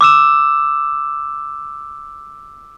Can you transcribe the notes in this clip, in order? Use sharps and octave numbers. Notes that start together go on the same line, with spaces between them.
D6 E6 E7